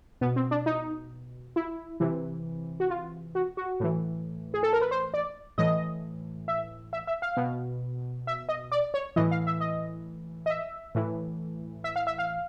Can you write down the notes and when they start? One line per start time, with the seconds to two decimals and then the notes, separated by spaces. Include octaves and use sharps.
0.21 B2 B3
0.36 C4
0.51 D4
0.66 D#4
1.56 E4
2.00 C3 E3
2.80 F#4
2.90 F4
3.35 F#4
3.57 F#4
3.80 A2 E3
4.54 G#4
4.63 A4
4.73 A#4
4.81 B4
4.91 C5
5.14 D5
5.58 A2 E3 D#5
6.48 E5
6.93 E5
7.07 E5
7.22 F5
7.37 B2
8.27 E5
8.49 D#5
8.72 D5
8.94 C#5
9.16 A2 E3 D#5
9.31 F5
9.47 E5
9.60 D#5
10.46 D#5
10.50 E5
10.95 A2 E3
11.84 E5
11.96 F5
12.07 E5
12.18 F5